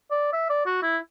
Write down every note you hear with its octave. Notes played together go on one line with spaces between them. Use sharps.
D5
E5
D5
F#4
E4